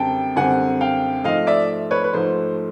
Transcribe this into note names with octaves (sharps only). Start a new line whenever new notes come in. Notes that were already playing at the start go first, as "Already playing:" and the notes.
Already playing: F#2 D3 G3 C4 G5 A5
F#2 D3 G3 C4 F#5 G#5
F5 G5
G#2 F3 A3 D#5 F5
D5 E5
B4 C#5
B4
G#2 F3 A3 C5